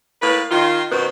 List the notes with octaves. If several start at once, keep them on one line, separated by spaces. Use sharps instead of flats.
A2 A#3 B4
D#3 F4
F#2 B2 D#3 B4 C5